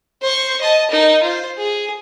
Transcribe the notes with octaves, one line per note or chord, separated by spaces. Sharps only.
C5 C#6
D#5 A5
D#4 A#4
F4 C5
G#4